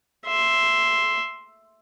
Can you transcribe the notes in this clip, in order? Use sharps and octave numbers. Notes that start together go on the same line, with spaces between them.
E5 C6